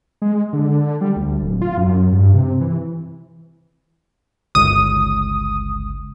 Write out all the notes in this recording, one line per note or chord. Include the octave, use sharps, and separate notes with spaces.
G#3
D3
G3
D2
D1
F4
F#2
G2
C3
E3
G1 C#2 D#6